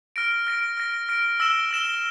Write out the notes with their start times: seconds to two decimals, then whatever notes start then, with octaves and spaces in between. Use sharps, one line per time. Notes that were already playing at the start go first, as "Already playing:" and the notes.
0.16 F6 A#6 D7
0.47 F6 A#6 D7
0.77 F6 A#6 D7
1.09 F6 A#6 D7
1.40 E6 A#6 E7 G7
1.71 E6 A#6 E7 G7